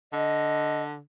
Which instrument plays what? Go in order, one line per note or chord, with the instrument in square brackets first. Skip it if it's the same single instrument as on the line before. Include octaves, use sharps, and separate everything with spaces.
[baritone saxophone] D3 [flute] D#5